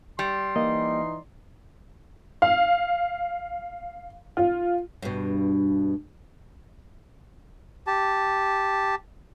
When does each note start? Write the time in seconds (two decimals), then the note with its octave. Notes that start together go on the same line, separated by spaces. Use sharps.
0.19 G3 C6
0.56 E3 A#3 D#4 D#5
2.42 F5
4.37 F4
5.03 G2 B2
7.87 G4 A5